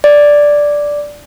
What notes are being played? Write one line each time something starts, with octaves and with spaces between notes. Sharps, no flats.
D5